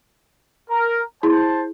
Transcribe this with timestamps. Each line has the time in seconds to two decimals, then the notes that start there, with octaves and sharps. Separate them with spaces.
0.70 A#4
1.23 E4 G#4 C5 A5